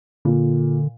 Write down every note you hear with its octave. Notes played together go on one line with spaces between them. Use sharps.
A#2 D3